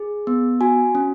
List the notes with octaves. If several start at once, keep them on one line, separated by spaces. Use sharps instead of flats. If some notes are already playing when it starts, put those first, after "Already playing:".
Already playing: G#4
B3
F#4 G#5
C#4